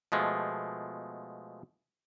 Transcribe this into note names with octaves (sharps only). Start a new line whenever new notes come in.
B2 F3 G#3 A3